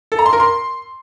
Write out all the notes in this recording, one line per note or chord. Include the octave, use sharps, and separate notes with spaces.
A4
A#5
C6
A#4
C6